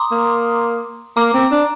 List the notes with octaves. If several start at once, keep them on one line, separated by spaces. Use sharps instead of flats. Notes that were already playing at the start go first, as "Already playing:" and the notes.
Already playing: A#5 C6 D6 D#6
A#3
A#3 A#5 D6
C4
D4